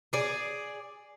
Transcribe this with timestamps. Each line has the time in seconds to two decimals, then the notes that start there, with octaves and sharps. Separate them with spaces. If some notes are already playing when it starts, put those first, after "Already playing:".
0.13 G#4 D5